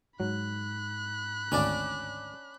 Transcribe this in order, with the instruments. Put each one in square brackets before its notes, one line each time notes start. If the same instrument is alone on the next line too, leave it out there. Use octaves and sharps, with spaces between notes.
[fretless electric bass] G#2 [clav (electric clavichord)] F#3 [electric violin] B5 F#6
[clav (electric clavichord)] G#1 D2 [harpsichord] C#4 D4 D5